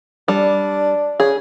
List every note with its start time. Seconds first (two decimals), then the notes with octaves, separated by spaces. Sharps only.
0.28 G3 D4
1.20 C#3 G#4